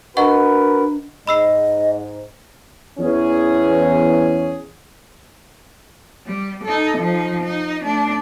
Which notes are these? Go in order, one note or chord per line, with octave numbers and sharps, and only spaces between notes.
D4 F#4 A#4 B4 D#5 F#5 C#6
G#2 D#5 B5 E6 C7
E2 C#4 G#4
G3
D#4 A4
F3 D#4
D#4
A3 D4